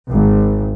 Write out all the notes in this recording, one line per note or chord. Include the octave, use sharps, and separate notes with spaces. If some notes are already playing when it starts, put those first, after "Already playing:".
G#1